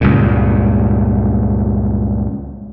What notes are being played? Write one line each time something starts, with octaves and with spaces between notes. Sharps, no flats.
C#2 G2 A#2